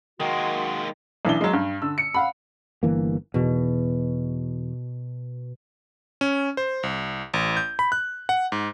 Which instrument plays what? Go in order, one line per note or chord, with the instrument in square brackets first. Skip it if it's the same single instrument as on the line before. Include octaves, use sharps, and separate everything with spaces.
[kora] D#3 [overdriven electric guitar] G#3 A#3 [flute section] F#4 F#5 C6
[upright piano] B1 E3 D4 G7
F#3 G#3
G2
D3 E6
C#7
F5 F#5 B5
[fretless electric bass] G1 E3 A#3
[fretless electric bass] E2 [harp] B2
[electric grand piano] C#4
C5
C2
A1
G6
B5
F#6
F#5
G#2